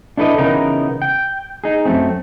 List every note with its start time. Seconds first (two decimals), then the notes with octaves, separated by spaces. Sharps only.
0.17 D4 E4 A4 B4 D#5
0.38 C#3 E3 B3 D#4 A#4
1.02 G5
1.64 D#4 G#4
1.86 F#2 A3 C4